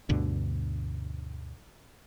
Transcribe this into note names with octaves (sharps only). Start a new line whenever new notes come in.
D2 G2 B2 D3